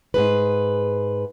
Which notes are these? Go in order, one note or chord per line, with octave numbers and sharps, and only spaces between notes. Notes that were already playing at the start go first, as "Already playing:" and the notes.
G#2 G#4 B4